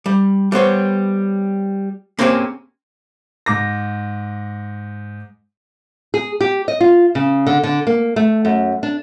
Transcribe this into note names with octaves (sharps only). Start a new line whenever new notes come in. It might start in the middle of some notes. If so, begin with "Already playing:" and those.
G3
G3 B3 C5 C#5
A#3 C4 C#4 F4 G4 G#4
G#2 D6 A#6
G#4
G4
D#5
F4
C#3
D3
D3
A#3
A3
F#2
D4